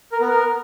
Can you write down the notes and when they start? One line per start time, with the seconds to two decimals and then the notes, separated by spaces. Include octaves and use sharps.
0.12 A#4
0.20 B3
0.29 A#4